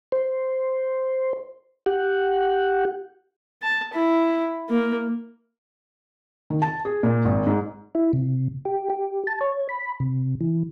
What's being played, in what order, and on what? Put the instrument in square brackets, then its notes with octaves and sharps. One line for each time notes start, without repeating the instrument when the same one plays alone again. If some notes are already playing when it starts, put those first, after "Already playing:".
[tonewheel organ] C5
G4 F#5
[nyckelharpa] A5
E4
A#3
[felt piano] D#3
A5
G#4
A#2
G#1
G#2
[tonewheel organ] E4
C3
G4
G4
A5
C#5
B5
C3
E3